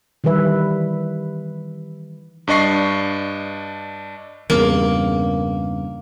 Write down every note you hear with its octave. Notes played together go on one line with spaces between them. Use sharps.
D#3 E3 G3 B4 E5
G2 D4 D#5 C#6 C7
E2 G2 C#3 A#3